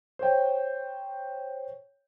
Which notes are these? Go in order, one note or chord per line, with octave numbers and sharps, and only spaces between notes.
C5 C#5 G5